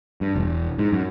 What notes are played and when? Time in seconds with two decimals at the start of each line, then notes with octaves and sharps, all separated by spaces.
0.21 G2
0.36 E1
0.78 G#2
0.92 F#2